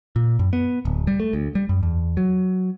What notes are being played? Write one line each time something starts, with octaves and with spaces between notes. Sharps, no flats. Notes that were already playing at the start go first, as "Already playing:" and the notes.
A#2
F#2
B3
D1
G3
A3
D2
G3
F#2
E2
F#3